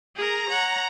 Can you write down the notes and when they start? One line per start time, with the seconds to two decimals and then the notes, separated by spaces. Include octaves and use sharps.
0.16 G#4 A#4 A#5
0.49 C#5 F#5